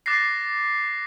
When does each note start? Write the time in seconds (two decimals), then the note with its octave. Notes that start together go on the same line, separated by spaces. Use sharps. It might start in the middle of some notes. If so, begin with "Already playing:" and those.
0.06 D6 F#6 A6 A#6 C7